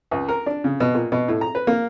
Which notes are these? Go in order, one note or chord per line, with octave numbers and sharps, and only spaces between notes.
C#2
A#4
D4
C#3
B2
A#2
B2
A2
A#5
B4
A#3